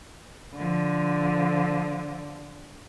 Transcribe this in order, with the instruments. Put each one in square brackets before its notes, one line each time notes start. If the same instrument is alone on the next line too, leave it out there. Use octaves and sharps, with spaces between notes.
[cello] D3 F3